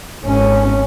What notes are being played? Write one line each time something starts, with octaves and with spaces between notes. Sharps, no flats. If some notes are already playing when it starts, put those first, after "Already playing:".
G#1 C#4